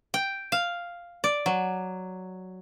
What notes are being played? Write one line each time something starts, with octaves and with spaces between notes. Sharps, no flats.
G5
F5
D5
F#3